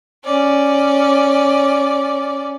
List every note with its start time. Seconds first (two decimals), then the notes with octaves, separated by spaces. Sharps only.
0.24 C#4 D5